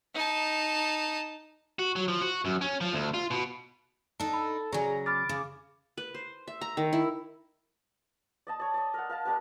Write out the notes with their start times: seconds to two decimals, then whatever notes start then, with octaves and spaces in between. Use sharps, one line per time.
0.14 D#4 A5
1.79 F#4
1.96 F#3
2.08 F3
2.21 F#4
2.45 F#2
2.61 C#4
2.81 F3
2.93 D2
3.14 F4
3.31 B2
4.20 D4 D#4 A4
4.33 B5
4.73 C#3 F#3 G#4 D5 G#5 A#5
5.06 B5 D6 F6 A6
5.29 C#3
5.97 B4
6.14 C5
6.47 E5
6.61 A#5
6.77 D#3
6.93 E4
8.47 D5 D#5 A5
8.60 C#5 D5
8.74 D5 D#5
8.94 A#4 F#5
9.09 A#4 F5 A5
9.25 D4 G4 A#4